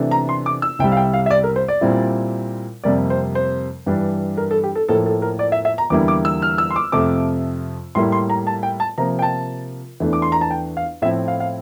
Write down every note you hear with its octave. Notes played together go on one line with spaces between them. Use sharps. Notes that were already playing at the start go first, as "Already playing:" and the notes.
Already playing: C3 E3 A3 D4
A#5
C6
D6
E6
C2 C3 G3 G5
F5
G5
F5
E5
D5
A#4
C5
D5
A#2 G3 C4 E4
F2 C3 G3 A#3 D5
C5
C5
G2 E3 G3 D4
A#4
A4
G4
A4
A2 F3 A#3 A4
A4
A#4
D5
E5
E5
A#5
E2 D3 G3 A#3 E4 D6
D6
E6
F6
E6
C6
D6
F2 C3 F3 A3 D6
A2 G3 A#3 E4 C6
C6
A#5
A5
G5
A5
C3 F3 A#3 A#5
G5
A5
E2 E3 A3 D4
D6
C6
A#5
A5
G5
F5
A2 F3 C4 E4 E5
F5
F5